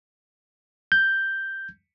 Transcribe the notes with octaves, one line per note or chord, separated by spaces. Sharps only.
G6